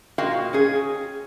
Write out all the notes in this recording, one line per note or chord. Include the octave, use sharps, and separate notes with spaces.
A#2 F#4 A#4 D#5 F5 G5
C#4 G#4